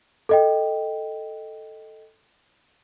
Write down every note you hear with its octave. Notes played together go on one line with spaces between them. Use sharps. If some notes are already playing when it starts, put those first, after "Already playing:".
A4 D#5 G5